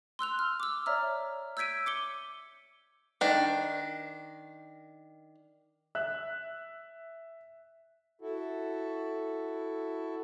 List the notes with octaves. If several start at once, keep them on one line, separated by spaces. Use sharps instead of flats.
C6 E6 F#6 F7
F6
D6 E6
C#5 D5 E5 A#5 F6
E6 G6 G#6 B6 D7 D#7
D6 C#7 G7
D#3 D4
E5 F#6
E4 F#4 A4